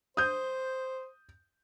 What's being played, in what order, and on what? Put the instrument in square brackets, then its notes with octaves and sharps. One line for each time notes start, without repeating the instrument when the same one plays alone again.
[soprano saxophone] C5 [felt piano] D#6 G6